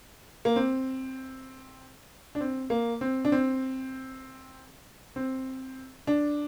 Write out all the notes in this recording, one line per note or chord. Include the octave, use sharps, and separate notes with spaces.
A#3
C4
D4
C4
A#3
C4
D4
C4
C4
D4